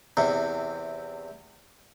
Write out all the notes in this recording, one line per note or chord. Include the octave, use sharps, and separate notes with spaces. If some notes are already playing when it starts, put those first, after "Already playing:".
E2 C3